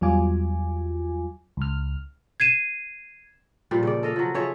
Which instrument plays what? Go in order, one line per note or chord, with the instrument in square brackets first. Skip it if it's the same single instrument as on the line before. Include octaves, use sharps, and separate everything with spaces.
[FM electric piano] E2 F#3 G3 F4 G#5 D6
C#2 F6
[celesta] G#6 C7 D#7 E7
[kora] A#2 F3 G3
C#3 D5
A4 D#5 F5
F3 F#3
F3 G#4 C#5 E5